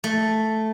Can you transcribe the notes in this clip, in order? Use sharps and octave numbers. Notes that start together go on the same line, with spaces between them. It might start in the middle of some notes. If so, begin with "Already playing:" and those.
A3